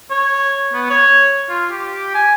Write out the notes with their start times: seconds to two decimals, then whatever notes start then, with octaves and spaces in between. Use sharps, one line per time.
0.11 C#5
0.73 B3
0.90 C#5
1.49 F4
1.71 G4
2.14 G#5